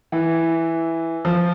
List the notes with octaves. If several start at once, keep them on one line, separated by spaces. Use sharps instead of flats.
E3
F3